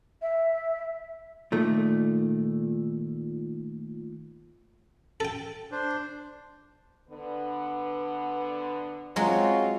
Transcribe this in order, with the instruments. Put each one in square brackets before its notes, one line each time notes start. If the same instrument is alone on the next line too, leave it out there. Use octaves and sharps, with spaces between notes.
[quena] E5
[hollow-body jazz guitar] A#2 D#3 A3
[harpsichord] A4 G5
[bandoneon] D4 C5
[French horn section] D3 B3 B4
[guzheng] F#3 G#3 [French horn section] C4 F4 C#5